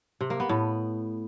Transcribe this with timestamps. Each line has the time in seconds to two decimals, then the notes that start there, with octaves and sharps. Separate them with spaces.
0.21 C3
0.30 A#3
0.40 B3
0.49 A2